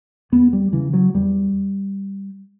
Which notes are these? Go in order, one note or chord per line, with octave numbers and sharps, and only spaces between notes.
E2 B3
G3
C#3 E3
F#3
E2 G3